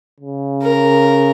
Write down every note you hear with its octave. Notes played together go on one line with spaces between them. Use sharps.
C#3
A#4